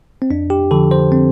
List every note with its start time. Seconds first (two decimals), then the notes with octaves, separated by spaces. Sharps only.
0.22 C4
0.30 F2 D4
0.50 G4
0.71 D3 F3 A4
0.91 C5
1.12 C4